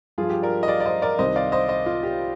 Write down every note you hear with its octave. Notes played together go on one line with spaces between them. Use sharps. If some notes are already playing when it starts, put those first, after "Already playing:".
G2 F3 F4 G#4
G4
A#4 D5
D#5
D5 F5
D5
C5 D#5
A#4 D5
C2 C3 D#3 C5 D#5
D5 F5
C5 D#5
C5 D#5
F4
G4